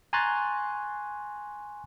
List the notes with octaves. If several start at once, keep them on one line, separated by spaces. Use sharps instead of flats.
G#5 A#5 C6 C#6 F#6 A6